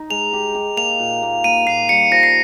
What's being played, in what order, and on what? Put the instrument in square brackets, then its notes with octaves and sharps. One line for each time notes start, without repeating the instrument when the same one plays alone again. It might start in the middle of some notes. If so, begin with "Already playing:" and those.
Already playing: [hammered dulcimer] D#4
[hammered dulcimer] G#3 [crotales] F7
[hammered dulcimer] G4
G4
[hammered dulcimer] A#3 [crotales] F7
[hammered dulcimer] A#2
A#3
[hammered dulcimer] A#3 [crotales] D#7
[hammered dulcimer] A#2 [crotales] C7
[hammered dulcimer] G3 [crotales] C#7
[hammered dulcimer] F3 [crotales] A#6
[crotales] C7